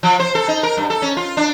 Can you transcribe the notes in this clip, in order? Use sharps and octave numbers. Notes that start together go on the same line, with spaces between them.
F3
C5
A4
D#4
A#4
G2
A4
C#4
F4
D4